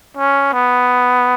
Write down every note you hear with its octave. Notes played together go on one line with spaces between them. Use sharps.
C#4
B3